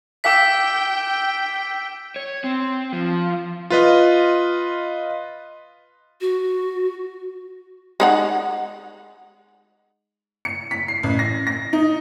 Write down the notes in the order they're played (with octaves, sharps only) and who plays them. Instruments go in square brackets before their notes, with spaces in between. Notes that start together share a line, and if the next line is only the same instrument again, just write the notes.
[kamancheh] G5 [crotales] D6 E6 B6
[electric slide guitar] C#5
C4
F3
[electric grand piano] F4 B4 D#5
[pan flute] F#4
[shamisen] G#3 D#4 F#5
[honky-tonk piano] C#7
B6
C7
A1
A#6
A#6
D#4